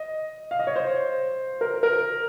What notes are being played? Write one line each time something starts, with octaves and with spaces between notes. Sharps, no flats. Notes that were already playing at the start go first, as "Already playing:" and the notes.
Already playing: D#5
F5
D#5
C#5
C5
A#4
A#4